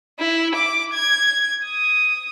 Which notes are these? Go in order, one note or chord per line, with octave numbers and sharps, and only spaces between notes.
E4
D6
G#6
D#6